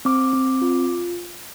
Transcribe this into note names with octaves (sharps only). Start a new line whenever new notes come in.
C4 D6
C4
F4